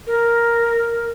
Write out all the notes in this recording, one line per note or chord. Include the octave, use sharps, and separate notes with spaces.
A#4